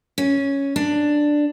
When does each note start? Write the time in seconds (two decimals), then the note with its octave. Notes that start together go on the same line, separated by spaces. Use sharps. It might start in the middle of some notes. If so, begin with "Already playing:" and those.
0.18 C#4
0.76 D4